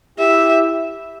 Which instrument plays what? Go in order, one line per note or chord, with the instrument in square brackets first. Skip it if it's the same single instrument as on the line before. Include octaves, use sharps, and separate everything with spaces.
[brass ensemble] E4 G4 [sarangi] E5